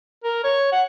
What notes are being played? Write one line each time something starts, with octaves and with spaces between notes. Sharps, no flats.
A#4
C#5
F#5